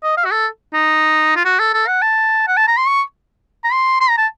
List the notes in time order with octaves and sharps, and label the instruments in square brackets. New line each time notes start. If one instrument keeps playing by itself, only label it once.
[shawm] D#5
F5
F#4
A4
D#4
F4
F#4
A4
A4
F#5
A5
F#5
A5
A#5
C6
C#6
A#5
C6
C6
A#5
A5